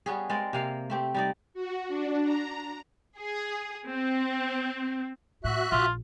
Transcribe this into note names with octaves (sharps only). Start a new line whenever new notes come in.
G3 B3 C#4 G#4
G#3 C4 A#4 D5
C3 A#3 F5
A3 C4 G4
G3 D#4 D5
F#4
D4
A#5
G#4
C4
A2 F#4 E5 F#6
A#1 F4